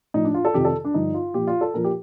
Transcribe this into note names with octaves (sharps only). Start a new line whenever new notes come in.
A2 F3 D#4
D4
F4
A4
F2 C3 D#3 G4
A4
D4
G2 D3 F3 D#4
F4
A#2 F3 G4
F4
A4
A#2 F3 A#4
G4